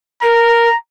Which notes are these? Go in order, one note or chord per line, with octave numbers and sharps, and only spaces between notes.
A#4 A#5